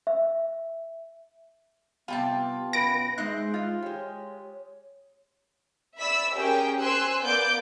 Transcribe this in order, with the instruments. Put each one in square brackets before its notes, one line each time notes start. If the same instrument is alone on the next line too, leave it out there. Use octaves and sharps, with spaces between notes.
[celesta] E5
[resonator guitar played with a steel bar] C3 G3 [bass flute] B3 [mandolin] F4 G5 A5
[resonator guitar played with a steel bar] F#2 B2 B4 [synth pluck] A#6 D7
[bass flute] G#3 [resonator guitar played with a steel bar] D#4 E5 [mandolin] C5 F#6
[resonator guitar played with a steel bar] D#4 F4
[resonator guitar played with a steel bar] G#3 G4 [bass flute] C#5
[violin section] D5 E5 B5 E6 B6
C#4 G4 G#4 A#4 G5
C5 G#5 C6 E6 F#6
A#3 B3 D5 D6 G6 D7